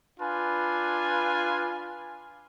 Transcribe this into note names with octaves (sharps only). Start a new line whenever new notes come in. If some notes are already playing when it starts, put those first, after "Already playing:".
D4 F4 B4 G#5